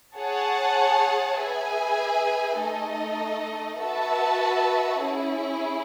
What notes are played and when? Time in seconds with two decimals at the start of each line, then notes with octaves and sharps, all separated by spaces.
0.17 G#4 C#5 F#5 A5
1.38 G#4 B4 E5 G#5
2.60 A3 D#4 A4 D#5
3.81 F#4 B4 E5 A5
5.03 C#4 E4 G#4